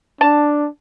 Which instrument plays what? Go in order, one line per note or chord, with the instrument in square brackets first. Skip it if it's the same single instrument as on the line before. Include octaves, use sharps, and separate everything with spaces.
[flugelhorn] D4 [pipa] A5